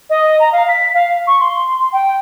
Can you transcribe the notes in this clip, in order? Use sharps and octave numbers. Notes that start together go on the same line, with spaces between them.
D#5
A#5
F5
B6
F5
C#6
C6
G5